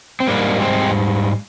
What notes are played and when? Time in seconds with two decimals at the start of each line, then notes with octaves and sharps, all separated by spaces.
0.20 C4
0.27 G#2 G3 A#3 D4
0.60 G#3 C4